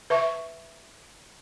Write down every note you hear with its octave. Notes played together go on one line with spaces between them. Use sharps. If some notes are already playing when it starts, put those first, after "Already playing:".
B4 E5 C#6